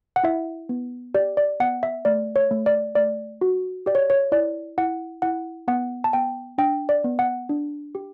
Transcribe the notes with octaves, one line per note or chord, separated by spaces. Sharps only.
F#5
E4 E5
B3
G4 D5
D5
B3 F#5
E5
A3 D5
C#5
A3
D5
A3 D5
F#4
G4 D5
C#5
C#5
E4 D5
E4 F#5
E4 F#5
B3 F#5
A5
B3 G5
D4 G5
D5
B3
F#5
D4
G4